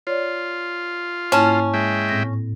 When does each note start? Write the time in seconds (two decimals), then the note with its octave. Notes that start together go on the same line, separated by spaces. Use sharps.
0.07 F4 C#5 D5
1.32 G#2 A#3 C#4 E4 A5
1.74 G#3 E5 G5
2.09 A2 C4 A#6